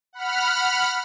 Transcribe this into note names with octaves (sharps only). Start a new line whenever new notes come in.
F#5 B5 F6